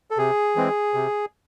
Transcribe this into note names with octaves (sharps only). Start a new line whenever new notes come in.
A4
C3 G#4
E3 G#3 C4
C3